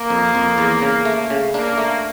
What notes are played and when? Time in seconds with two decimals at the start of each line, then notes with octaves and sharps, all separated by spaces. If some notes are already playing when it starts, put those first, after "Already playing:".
Already playing: A#3
0.10 F2
0.35 F2
0.58 E2
0.82 C#3
1.05 A3
1.30 C#3
1.54 A#3 D4
1.78 A3